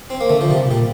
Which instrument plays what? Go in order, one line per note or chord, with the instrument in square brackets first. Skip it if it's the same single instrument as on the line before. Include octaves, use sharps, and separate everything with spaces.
[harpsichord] C4
A#3
[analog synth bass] D3 [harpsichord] A3
[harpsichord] F3
[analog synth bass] C3 [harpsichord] G3
[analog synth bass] A#2 [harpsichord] G3